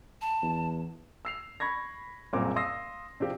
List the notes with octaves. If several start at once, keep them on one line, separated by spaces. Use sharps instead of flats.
A5
E2
E6 C7 F7
B5 C#6 G#6 A#6
F#1 C2 A#2 C4 A#4 D6
F5 C6 D#6 E6 A#6 C7
C3 F3 C4 D4 F4 G4